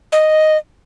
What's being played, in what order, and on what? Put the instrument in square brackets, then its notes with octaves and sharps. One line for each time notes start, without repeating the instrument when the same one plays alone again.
[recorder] D#5